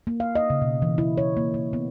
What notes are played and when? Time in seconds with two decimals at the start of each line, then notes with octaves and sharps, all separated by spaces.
0.07 A#3
0.20 F5
0.35 D#5
0.50 C#3
0.62 B2
0.82 E3
0.98 E4
1.18 C#5
1.37 A#3
1.54 A#3
1.73 B3